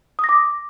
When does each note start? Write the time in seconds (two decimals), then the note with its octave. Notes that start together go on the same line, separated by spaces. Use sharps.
0.19 D#6
0.24 A#6
0.29 D6